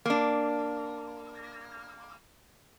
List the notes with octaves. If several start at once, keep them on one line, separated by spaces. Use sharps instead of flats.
A#3 D4